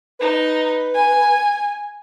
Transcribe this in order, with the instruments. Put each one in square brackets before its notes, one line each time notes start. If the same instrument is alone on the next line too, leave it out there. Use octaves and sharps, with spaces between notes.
[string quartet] D#4 [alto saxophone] B4
[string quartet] G#5